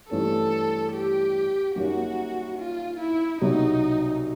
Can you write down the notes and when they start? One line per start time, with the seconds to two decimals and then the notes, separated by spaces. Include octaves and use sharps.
0.10 G2 E3 A3 C#4 A4
0.93 G4
1.76 F#2 D#3 G3 A#3 C#4 F#4
2.58 F4
3.00 E4
3.42 C2 B2 F#3 D#4